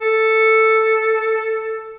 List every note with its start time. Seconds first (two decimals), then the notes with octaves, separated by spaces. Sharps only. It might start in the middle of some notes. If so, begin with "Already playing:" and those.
0.01 A4